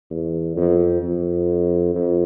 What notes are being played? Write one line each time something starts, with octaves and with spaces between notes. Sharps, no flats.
E2
F2
F2
F2